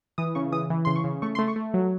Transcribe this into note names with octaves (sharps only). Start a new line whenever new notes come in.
E3 D#6
C#3 C#6
E3 D#6
E3
C#3 C6
C#6
C#3
A3 C#6
C6
A3
C#6
A3
F#3